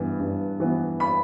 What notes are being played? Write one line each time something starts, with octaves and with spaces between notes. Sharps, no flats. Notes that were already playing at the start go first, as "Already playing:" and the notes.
Already playing: G2 E3 B3
G2
E3 B3
B5